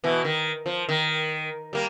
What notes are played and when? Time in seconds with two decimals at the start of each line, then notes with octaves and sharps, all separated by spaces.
0.04 B2 E3
0.25 D#3
0.66 F3
0.89 D#3
1.73 G3 A#3